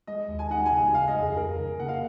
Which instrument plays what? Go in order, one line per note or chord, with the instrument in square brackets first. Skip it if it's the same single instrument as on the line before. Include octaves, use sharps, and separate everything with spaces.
[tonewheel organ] G#3 [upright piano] D#5
[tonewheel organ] D#2
[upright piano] G#5
[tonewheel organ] D#4 [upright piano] F#5
[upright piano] G#5
[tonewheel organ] C#3
[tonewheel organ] G#3 [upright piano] F5
[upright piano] D#5
[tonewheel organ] F2
[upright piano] G#4
[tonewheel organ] F2 [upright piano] A#4
[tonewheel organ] C#3
[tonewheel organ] A#3 [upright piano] F#5
[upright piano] F5